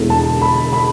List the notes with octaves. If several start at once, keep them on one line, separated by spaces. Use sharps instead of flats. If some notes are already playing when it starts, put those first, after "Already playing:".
Already playing: E1 E2 D3 A3 E4
A5
B5
B5